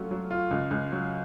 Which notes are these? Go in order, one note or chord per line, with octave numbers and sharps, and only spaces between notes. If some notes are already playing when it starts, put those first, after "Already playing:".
Already playing: F#3 A3 C#4 F4
F#3
F4
C#2
C#2
F#3